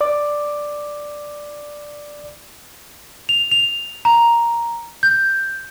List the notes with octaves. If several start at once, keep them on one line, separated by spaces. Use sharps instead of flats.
D5 D6
F7
F7
A#5
G6